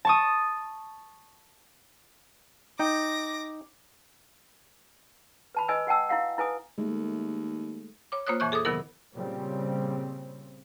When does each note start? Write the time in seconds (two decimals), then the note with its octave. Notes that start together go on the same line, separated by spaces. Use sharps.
0.05 A5 C#6 D#6
2.79 D#4 G5 D6 A#6
5.55 B4 A5 B5
5.68 B4 D#5 G#5 E6
5.87 F#4 F#5 G5 A5 E6
6.09 E4 F#4 F5 F#5
6.38 E4 B4 G#5 D#6
6.78 D#2 G#3 A3
8.12 C#5 D6
8.27 A#3 F4 C5 C#5 D#6 F#6
8.40 F2 A#2 E3 C#6 F#6
8.52 G#4 A4 D6 D#6
8.65 C3 D#3 F#3 B3 E4 A#4
9.14 A#2 C#3 G3 C4